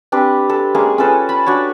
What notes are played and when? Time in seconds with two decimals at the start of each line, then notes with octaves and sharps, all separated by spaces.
0.12 C4 D4 G4 B4
0.50 A4
0.74 G#3 A#3 C#4 G#4
0.98 C#4 F4 A4 B4
1.29 A5 B5
1.46 D4 F#4 C#5